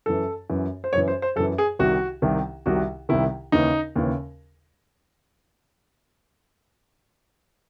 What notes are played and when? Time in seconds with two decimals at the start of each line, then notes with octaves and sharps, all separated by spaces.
0.06 F#2 E3 A4
0.50 F#2 E3
0.84 C5
0.93 F#2 E3 C#5
1.08 C5
1.22 C5
1.36 F#2 A4
1.40 E3
1.58 G#4
1.79 C2 C3 D#3 F#4
2.22 C2 C3 D#3
2.66 C2 C3 D#3 F#4
3.09 C2 C3 D#3 E4
3.52 D#2 C#3 E3 D#4
3.95 D#2 C#3 E3